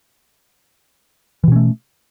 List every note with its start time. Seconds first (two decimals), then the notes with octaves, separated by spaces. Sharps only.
1.44 E3
1.48 B2
1.52 C#4
1.56 A3